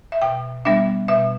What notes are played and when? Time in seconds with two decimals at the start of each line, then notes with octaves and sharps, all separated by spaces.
0.12 E5
0.22 B2 G5
0.65 G3 B3 D4 E5
1.08 B2 E5